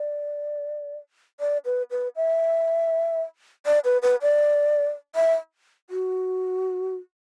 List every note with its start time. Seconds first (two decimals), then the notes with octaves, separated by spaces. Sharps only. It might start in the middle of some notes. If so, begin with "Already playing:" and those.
Already playing: D5
1.40 D5
1.65 B4
1.91 B4
2.16 E5
3.66 D5
3.85 B4
4.02 B4
4.22 D5
5.16 E5
5.90 F#4